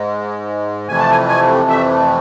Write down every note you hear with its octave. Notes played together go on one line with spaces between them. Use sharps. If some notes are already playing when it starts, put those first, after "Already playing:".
Already playing: G#2 G#3
F2 C3 E3 A3 G#5
A5
G#5
G#5
E5